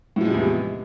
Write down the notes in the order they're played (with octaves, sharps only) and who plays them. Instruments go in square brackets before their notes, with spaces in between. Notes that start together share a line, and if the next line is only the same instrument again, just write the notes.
[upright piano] A2
F3
G#3
C3
E2